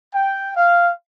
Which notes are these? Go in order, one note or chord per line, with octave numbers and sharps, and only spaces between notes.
G5
F5